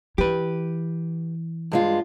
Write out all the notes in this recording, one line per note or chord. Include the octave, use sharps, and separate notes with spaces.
E3 G4 B4
G2 G#3 F4